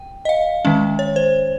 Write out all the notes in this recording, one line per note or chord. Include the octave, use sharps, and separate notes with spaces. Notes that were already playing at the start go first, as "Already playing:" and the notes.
Already playing: G5
D#5
F5
D#3 G#3 C#4
C#5
C5